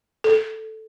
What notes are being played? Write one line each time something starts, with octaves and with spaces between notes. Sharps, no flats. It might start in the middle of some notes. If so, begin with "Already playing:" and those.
A4